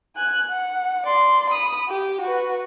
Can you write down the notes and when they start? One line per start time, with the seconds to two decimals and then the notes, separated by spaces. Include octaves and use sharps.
0.16 G#5 F#6
0.50 F#5
1.06 D5 C6
1.50 B5 D#6
1.89 G4
2.21 F#4 B4